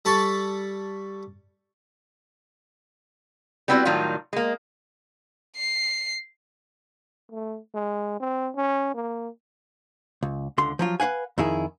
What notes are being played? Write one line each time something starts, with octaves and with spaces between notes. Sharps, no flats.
G3 A4 A5 B5 C#6
G3 B3 C4 E4 F#4 D5
A2 D#3 F#3 G3 F4
G#3 A#3
C7
A3
G#3
C4
C#4
A#3
C#2
C#2 D3 C6
F3 F#3 F4
B4 C5 F5 F#5 G#5
F2 D#3 E4 G#4